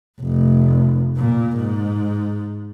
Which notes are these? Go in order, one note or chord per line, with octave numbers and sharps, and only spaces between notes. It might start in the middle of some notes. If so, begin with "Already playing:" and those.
F1
A#2
G#2